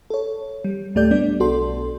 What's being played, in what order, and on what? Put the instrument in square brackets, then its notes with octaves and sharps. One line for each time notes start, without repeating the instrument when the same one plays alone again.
[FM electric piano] A4 C#5
G3
D2 A2 A3 G4 D5 G6
G3 B3 D4 D5
B1 F#4 A4 C6